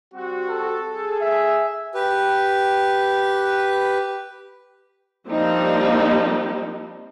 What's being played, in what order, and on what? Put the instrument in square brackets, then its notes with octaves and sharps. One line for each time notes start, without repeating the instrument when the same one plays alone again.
[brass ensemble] G3 C4 F#4
[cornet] A4
[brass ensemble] G#4
[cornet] E5
[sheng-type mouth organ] G4 B4
[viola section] F3 G3 A#3 C4 D4 D#4